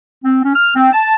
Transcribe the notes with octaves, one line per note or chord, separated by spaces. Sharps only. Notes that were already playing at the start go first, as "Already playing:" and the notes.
C4
C#4
F6
C4
A5